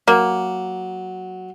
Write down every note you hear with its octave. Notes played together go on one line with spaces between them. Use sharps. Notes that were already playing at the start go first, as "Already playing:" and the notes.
F#3 A#3